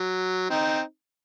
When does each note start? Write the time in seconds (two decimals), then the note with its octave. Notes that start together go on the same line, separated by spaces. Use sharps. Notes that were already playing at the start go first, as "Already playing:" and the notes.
Already playing: F#3
0.50 C4 D#4